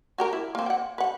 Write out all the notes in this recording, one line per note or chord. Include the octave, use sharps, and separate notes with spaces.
F#4 G4 A#4
E4
A#3 C4
F#5 G5
B4 F#5